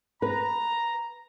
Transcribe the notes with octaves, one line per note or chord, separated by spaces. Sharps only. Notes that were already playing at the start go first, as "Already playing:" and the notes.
B4 A#5